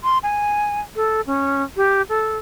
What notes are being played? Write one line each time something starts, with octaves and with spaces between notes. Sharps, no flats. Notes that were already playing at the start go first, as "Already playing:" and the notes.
C6
G#5
A4
C#4
G4
A4